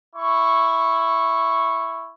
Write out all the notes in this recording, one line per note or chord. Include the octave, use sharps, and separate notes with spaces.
E4 C#6